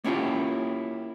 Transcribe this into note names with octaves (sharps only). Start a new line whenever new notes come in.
A#3 C#4 E4 F4 G4